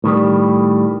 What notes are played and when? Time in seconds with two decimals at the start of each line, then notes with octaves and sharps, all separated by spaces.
0.04 A2 D#3 G3